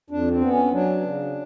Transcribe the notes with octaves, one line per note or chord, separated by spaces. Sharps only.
F2 D4
C4
B3
C#4
F#3 D4
C#3